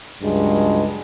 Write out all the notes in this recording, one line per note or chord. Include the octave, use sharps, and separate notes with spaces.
C#2 G2 F#3 G#3